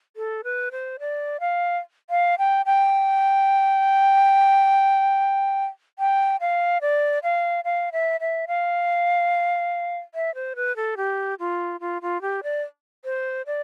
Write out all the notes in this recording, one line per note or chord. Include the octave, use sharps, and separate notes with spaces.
A4
B4
C5
D5
F5
F5
G5
G5
G5
F5
D5
F5
F5
E5
E5
F5
E5
C5
B4
A4
G4
F4
F4
F4
G4
D5
C5
D5